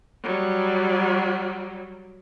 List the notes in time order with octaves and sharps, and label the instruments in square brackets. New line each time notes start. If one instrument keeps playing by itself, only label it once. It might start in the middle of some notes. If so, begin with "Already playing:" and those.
[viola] F#3 G3